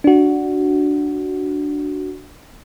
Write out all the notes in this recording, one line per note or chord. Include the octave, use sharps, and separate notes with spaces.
D4 F#4